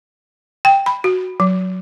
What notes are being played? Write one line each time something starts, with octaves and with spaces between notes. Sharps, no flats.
G5
B5
F#4
F#3